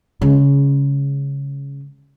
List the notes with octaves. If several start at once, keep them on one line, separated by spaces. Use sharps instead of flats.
C#3 G#3